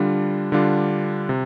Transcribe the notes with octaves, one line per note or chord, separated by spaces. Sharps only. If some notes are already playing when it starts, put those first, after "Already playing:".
Already playing: D3 G3 D4 F4
D3 G3 D4 F4
C3